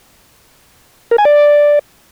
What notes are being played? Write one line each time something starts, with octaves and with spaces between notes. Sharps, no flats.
A#4
G#5
D5